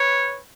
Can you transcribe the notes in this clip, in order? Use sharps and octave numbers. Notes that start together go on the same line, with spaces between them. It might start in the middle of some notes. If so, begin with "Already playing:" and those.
Already playing: B4 C#5